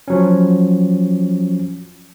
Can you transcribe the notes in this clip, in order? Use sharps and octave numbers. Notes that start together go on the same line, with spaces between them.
F3 F#3 C#4